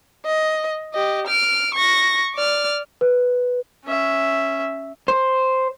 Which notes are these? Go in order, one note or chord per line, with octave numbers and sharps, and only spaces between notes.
D#5
G4 D#5
F6 D7
C#6 A#6
D5 F6
B4
C#4 E5
C5